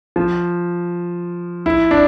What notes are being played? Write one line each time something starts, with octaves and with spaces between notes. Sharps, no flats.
F3
E4
D4